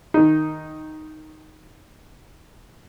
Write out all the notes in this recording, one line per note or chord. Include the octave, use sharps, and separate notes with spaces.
D#3 D#4